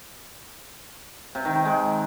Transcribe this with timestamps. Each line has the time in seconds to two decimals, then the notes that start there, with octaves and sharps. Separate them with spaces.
1.35 C3
1.45 D#3
1.55 D#3
1.65 G#3